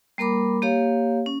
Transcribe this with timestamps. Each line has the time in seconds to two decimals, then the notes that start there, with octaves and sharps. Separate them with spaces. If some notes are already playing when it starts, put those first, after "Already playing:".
0.18 G3 A#3 A#4 B5 D6
0.62 A#3 G4 C#5 F5
1.26 C#4